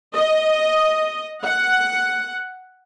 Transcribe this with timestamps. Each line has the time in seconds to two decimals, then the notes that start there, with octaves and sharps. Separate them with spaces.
0.15 D#5
1.44 F#5